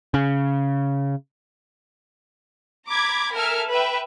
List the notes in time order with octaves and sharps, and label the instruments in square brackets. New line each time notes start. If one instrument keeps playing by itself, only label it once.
[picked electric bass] C#3
[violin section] A#5 B5 D6 G#6
A4 A#4 E5 G#5 F6
B4 E5 G5